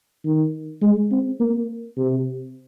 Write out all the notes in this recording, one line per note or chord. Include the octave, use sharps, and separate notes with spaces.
D#3
G#3
C4
A#3
C3